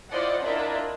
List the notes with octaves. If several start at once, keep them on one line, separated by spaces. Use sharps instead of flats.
E4 F4 C5 D5 D#5 F#5
D4 E4 F4 A#4 D#5 E5